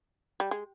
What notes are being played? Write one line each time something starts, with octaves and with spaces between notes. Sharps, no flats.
G3
G#3